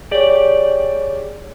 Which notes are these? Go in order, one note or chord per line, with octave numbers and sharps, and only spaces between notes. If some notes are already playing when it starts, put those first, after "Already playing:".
G4 G#4 C#5 D5